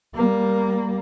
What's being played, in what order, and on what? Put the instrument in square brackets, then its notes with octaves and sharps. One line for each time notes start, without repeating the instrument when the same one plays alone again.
[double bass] G3 A#3